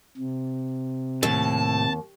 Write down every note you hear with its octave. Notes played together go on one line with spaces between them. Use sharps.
C3
D#2 A2 A5